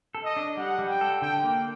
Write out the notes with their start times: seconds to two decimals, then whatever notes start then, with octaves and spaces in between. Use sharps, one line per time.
0.15 A4
0.25 D#5
0.36 D4
0.57 G3 F#5
0.79 G3
0.89 G5
1.01 A4
1.22 D3 G5
1.43 A#3